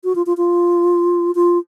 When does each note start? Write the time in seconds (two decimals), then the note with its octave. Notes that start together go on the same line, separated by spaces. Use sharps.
0.04 F#4
0.15 F4
0.26 F4
0.37 F4
1.35 F4